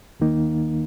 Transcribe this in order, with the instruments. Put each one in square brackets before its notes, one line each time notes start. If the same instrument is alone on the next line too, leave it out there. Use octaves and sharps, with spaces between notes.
[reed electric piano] D#2 D#3 A#3 D#4